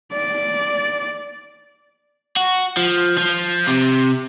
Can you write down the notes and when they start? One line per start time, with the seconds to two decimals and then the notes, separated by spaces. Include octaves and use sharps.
0.13 D5
2.36 F#4
2.77 F3
3.18 F3
3.68 C3